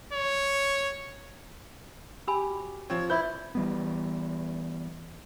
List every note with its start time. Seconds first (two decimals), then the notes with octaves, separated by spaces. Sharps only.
0.13 C#5
2.28 G4 G#5 B5 E6
2.51 F#4
2.90 F3 C4 C#5
3.10 E4 B4 C5 D5 G6
3.55 E3 G3 B3